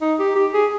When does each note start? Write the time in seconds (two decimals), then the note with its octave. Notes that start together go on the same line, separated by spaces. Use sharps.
0.01 D#4
0.19 G4
0.36 G4
0.54 G#4